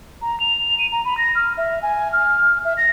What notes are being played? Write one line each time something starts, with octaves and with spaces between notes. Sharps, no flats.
A#5
F7
D#7
A#5
B5
A#6
F6
E5
G#5
F6
E5
A#6